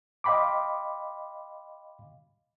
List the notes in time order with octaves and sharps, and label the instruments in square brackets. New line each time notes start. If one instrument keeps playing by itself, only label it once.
[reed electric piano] D#5 F5 G5 B5 C6 D6